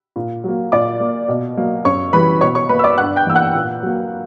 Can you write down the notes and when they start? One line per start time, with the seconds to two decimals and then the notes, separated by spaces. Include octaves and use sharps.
0.16 A#2
0.44 F#3 A#3
0.72 A#2 D5 D6
1.00 A#3
1.28 B2
1.57 F#3 A#3
1.84 F#2 C#5 C#6
2.13 E3 G3 B4 B5
2.41 B2 C#5 C#6
2.55 C#5 C#6
2.69 A#3 B4 B5
2.79 E6
2.84 D5 D6
2.98 G2 F#5 F#6
3.16 G5 G6
3.26 E3 A#3 E6
3.35 F#5 F#6
3.55 A#2
3.83 F#3 A#3